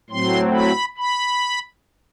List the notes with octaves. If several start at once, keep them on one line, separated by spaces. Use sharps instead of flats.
A2 F#3 C4 C6
B5
B5